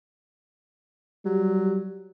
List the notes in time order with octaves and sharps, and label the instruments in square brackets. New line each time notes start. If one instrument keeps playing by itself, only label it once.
[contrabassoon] F#3 [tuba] G3